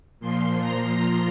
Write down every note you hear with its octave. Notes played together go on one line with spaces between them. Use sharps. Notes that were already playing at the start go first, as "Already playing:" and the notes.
A#2 F3 C6
A#5
C6